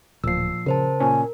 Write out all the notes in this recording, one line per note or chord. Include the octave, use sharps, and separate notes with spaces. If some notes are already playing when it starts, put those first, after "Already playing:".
D1 A#2 F3 E6 C7
C#3 A#4 C5 A5
A#2 C#4 A#4 G#5